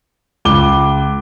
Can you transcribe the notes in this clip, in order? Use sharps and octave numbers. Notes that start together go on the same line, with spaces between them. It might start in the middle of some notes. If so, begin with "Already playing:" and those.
C#2 D6 G7